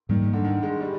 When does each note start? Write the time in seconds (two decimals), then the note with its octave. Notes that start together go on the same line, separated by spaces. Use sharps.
0.09 G#2 D#3 G3 A#3
0.33 D3
0.44 D#3
0.63 G#3
0.80 G3